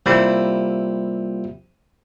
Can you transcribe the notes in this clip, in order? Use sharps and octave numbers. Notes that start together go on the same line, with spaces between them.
C3 G3 A#3 E4 F4